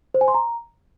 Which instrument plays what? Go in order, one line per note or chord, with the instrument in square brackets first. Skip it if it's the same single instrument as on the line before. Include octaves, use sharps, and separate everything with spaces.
[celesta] C5
G#5
C6
A#5